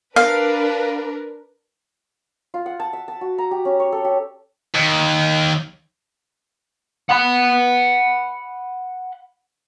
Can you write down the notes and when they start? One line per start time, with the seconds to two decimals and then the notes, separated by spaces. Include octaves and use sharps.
0.16 D4 A#4 B4 F5
2.54 F4
2.66 F#5
2.80 A5
2.93 E5
3.08 A5
3.21 F#4
3.38 A#5
3.51 G4
3.65 C#4
3.80 C#5
3.92 A4
4.05 G4
4.74 D#2
7.10 F#5 B5